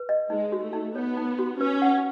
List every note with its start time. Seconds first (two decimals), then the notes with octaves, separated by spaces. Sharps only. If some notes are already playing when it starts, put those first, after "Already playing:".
Already playing: B4
0.09 D#5
0.30 G#3 D#4
0.52 F#4
0.63 A3
0.73 D#4
0.96 B3 C#5
1.17 D#4
1.39 F#4
1.60 C#4 B4
1.82 F#5